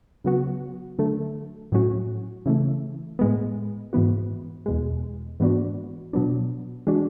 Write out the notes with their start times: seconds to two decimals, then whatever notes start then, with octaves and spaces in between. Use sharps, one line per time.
0.24 C#3 F#3 B3 F#4
0.99 D3 F#3 A3
1.72 A2 F#3 C#4 F#4
2.46 C#3 E3 A3
3.19 A2 G#3 B3
3.93 G#2 E3 B3 F#4
4.66 E2 B2 G#3
5.40 G#2 E3 B3 D4 F#4
6.13 B2 F#3 B3 D4
6.87 E3 G#3 D4 F#4